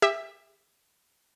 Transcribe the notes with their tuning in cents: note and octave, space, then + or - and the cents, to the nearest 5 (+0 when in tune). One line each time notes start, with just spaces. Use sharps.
G4 +35 E5 +0